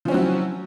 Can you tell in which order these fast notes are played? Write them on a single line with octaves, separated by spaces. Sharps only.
F3 C#4 C4 F#3 E4